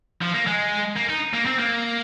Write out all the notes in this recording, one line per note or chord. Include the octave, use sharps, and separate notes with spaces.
F3
A#3
G#3
A#3
D#4
A#3
C4
A#3